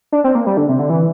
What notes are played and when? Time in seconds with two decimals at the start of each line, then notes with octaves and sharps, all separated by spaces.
0.12 D4
0.24 C4
0.35 A#3
0.46 G3
0.57 D3
0.69 C3
0.79 D3
0.90 E3